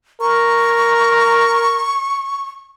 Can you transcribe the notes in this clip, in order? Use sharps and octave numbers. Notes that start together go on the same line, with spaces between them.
A#4 C#6